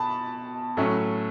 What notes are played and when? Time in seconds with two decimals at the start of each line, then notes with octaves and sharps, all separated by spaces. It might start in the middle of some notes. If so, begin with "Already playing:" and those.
Already playing: B2 A5 B5
0.77 A2 F#3 A3 C#4